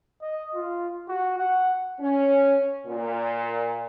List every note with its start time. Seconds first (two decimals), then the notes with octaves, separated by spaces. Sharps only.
0.22 D#5
0.55 F4
1.08 F#4
1.38 F#5
1.99 C#4
2.85 A#2